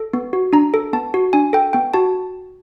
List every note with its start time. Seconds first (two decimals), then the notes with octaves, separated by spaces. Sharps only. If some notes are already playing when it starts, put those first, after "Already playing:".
Already playing: A4
0.13 B3
0.33 F#4
0.53 D4 A#5
0.74 A4
0.93 B3 A5
1.14 F#4
1.33 D4 G#5
1.53 A4 G5
1.73 B3 G5
1.94 F#4 A5